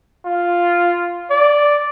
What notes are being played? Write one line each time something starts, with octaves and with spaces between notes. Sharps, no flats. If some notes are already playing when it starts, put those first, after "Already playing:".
F4
D5